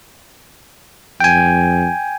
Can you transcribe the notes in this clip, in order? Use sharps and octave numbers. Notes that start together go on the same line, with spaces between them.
F2 G5 G#5